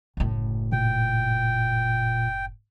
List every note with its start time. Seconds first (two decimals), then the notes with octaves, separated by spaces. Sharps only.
0.17 F#1 A2
0.72 A#2 G5